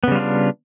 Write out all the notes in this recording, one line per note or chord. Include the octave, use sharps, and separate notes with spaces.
C#3 G3 B3 D4 F4